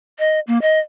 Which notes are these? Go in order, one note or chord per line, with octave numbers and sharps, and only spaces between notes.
D#5
A#3
D#5